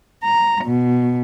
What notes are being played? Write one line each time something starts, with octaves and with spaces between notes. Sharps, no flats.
A#5
B2